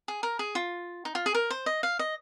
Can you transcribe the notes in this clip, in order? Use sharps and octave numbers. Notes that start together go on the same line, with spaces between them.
G#4
A#4
G#4
F4
D#4
F4
G#4
A#4
C5
D#5
F5
D#5